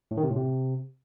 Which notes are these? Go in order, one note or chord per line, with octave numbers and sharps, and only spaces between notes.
A2
D#3
C3
A2
C3